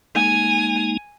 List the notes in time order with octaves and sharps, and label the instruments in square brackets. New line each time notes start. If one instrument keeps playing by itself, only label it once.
[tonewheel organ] G#3 A#3 D#4 [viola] G#5